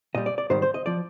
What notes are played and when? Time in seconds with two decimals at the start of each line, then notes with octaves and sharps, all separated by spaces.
0.15 A#2 G3 D#5
0.26 D5
0.38 D5
0.50 G#2 D#3 G3 C5
0.62 C5
0.74 D#5
0.86 F3 D5